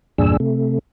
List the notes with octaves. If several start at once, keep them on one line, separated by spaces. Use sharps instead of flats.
E2 G2 A#2 D4 G#4 E6
C3 A3